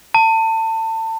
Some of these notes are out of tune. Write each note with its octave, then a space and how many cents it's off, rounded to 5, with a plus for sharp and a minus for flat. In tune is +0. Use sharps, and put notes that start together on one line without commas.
A5 +30